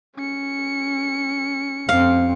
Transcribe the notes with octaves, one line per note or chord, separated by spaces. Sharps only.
C#4 C#7
F2 C4 F5